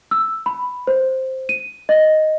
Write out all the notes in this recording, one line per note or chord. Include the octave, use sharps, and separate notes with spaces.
E6
B5
C5
D#7
D#5